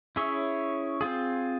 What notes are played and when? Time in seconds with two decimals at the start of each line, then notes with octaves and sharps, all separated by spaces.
0.16 C#4 E4 G#4 C#5 E5
1.01 C4 F4 G#4